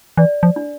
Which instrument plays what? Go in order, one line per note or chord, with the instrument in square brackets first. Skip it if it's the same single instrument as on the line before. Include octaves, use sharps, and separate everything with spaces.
[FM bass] E3 [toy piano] D5
[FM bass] F3
[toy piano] D4